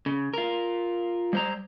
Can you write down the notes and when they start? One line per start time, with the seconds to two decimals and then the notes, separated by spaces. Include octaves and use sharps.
0.06 C#3
0.34 F4 A#4
1.33 G3 C5 A#5